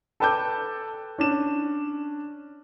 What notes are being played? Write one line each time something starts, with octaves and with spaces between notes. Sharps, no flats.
A4 B4 G5 A5 D6 G6
C#4 D4 E7